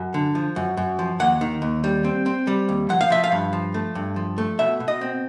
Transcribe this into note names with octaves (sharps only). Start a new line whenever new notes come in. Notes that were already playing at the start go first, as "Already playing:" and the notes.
Already playing: F#2
D3
F3
F#2
F#2
F3
D#2 F#5
D#3
D#2
G3
C4
C4
G3
D#2
F3 F#5
F5
F3 E5
F5
G2
F3
A3
G2
F3
A3
B2 E5
B2
D#5
C4